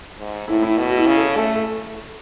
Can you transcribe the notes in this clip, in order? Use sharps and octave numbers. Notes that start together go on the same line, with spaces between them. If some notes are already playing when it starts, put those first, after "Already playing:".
G#2
A2 E4
E4
B2
F#4
E4
C#3
A4
A3 A4
A4